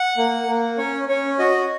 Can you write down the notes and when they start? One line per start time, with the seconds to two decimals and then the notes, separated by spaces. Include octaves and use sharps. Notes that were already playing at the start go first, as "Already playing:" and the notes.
Already playing: F#5
0.17 A#3
0.48 A#3
0.78 C#4 C#5
1.08 C#4 C#5
1.39 F#4 D#5